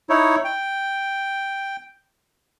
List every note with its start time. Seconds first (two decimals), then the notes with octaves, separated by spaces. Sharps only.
0.10 D#4 E4 C#5
0.44 G5